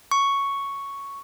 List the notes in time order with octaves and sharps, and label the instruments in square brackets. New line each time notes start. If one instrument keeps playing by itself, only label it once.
[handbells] C#6